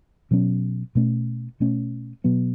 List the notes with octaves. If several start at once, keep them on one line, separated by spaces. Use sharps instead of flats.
B2 F#3 C#4
B2 A3 C#4
B2 A3 C#4
B2 F#3 B3